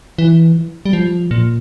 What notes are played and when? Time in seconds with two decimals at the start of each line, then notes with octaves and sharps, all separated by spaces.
0.18 E3
0.86 G3
0.93 F3
1.31 A#2